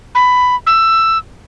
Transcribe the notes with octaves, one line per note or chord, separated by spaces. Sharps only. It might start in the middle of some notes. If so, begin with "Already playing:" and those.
B5
E6